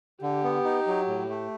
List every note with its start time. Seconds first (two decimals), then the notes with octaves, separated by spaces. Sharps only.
0.22 D3 G4
0.43 B3
0.65 D#4
0.87 F#3
1.07 A2
1.29 A3